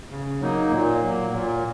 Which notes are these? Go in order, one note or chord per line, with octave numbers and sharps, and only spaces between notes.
C#3
F#3 A#3 D#4
A#2
F#3 A#3
A#2